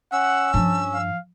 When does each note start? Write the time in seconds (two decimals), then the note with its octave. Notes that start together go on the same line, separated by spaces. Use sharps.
0.12 C#4 F#5 E6
0.54 G2 F3 A5
0.94 F5